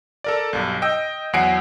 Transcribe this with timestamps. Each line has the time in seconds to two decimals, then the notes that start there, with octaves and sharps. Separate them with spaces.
0.24 A4 A#4 D5
0.53 B1 G2
0.82 D#5 G5 E6
1.33 E2 F#3 F#5 G#5 C7 D7